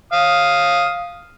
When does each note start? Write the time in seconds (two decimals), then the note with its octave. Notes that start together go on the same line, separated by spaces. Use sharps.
0.13 F5 D#6